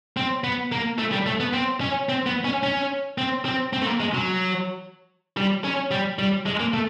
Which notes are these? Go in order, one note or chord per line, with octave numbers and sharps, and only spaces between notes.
C4
B3
A#3
A3
G3
A3
B3
C4
C#4
C4
B3
C#4
C#4
C4
C4
C4
A3
A#3
G#3
F#3
G3
C#4
G3
G3
G#3
A#3
A3